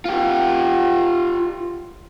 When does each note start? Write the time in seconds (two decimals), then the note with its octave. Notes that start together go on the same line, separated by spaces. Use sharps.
0.05 F4 G4